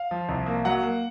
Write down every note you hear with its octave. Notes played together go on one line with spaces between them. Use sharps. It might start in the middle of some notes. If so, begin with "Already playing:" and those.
Already playing: F5
F3
C2
A#3
F#3 F#5
A#3